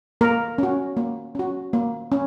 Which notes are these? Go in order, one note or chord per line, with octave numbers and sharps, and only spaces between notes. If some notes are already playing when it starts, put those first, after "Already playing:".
A#3 A#4
C#4 F#4
A#3
C#4 F#4
A#3
C#4